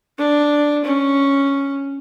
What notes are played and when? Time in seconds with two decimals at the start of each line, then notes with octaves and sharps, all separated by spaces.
0.18 D4
0.84 C#4